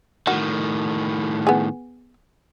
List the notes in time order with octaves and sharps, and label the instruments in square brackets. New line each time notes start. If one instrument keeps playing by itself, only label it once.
[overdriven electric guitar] A2 D#3 [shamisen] F#4
[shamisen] B3 G#4